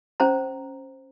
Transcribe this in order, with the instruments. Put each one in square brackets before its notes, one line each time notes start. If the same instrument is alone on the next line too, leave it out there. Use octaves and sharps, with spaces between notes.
[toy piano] C#4 C5 A#5